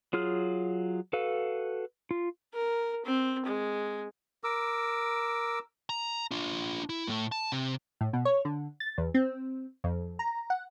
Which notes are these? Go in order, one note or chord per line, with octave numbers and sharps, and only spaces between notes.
F#3 F4 G#4 F6
F#4 A4 B4 F5
F4
A#4
C4
G#3
A#4 D6 E6
A#5
D4 F4
E4
A2 A3
A5
C3
A2
B2
C#5
D3
A6
E2
C4
F2
A#5
F#5